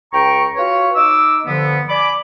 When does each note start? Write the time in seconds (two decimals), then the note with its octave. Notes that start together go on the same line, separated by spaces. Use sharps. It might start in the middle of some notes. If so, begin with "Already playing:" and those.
0.12 C#2 G5 A#5 C#6
0.56 F4 F#4 B4 C#5
0.96 D#4 D#5 D6 E6
1.45 G2 D3 F3 B3
1.88 D5 G#5 B5 D6